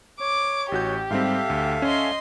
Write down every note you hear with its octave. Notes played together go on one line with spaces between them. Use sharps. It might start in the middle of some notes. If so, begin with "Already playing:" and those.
C#5 D6
A1 F#4 G4 G6
G#2 G3 C4 A4 E5 F5
D2
C#4 D#5 C6